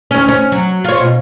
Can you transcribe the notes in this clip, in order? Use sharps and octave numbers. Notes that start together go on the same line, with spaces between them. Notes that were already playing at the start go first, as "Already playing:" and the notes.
D2 C#4
C#4
F#3
F4 C#5
B2